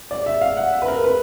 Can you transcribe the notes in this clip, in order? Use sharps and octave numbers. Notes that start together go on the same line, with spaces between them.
D5
E5
F5
F#5
E5
B4
A#4
B4